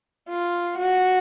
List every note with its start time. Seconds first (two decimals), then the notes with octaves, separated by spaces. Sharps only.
0.29 F4
0.78 F#4